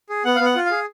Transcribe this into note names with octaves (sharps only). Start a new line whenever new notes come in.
G#4
B3 F#5
B3 F5
F#5
F4
F5
G#4